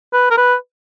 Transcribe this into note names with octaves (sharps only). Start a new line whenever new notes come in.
B4
A#4
B4